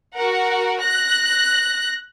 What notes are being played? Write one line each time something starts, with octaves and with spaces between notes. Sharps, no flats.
F#4 A#4 F#5
F#6 A#6